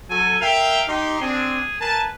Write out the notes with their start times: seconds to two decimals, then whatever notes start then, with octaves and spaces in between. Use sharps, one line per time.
0.10 F#3 C#4 A4 G#5
0.41 A#4 E5 F5 G5
0.88 D#4 G4 C6
1.21 C4 D4 G#4
1.81 A#4 B4 G#5 A5